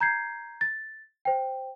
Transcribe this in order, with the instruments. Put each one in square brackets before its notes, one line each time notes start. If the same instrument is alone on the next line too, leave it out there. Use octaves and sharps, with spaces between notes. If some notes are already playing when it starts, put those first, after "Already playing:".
[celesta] A#5 G6 G#6 C7
A6
C5 G5